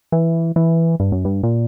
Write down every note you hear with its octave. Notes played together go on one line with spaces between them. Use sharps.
E3
E3
G2
F#2
G2
A#2